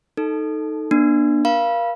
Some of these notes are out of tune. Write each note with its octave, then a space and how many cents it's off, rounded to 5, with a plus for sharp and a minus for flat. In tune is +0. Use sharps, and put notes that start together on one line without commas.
D#4 +0 A4 +0
B3 -45 D4 +15
A#4 +35 F5 -15 B5 -30